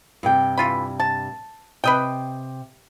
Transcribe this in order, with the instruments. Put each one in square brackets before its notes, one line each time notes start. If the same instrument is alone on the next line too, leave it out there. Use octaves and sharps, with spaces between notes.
[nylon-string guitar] G2 C3 G5
[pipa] E3 F4 B5
A5
[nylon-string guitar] C3 [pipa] B4 D#5 G5